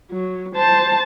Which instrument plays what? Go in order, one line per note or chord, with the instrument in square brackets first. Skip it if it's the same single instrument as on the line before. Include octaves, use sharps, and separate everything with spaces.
[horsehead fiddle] F#3
C5 A5